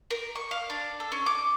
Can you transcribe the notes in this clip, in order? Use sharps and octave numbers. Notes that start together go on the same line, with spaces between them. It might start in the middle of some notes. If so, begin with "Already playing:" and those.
A#4
C#6
F5
D4
A4
C#4
D6